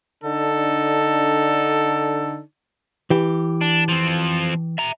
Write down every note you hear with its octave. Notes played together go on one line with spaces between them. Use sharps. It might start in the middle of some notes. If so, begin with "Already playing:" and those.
D3 D4 D#4 A4
E3 G4
D4
F3 C4
E5 A#5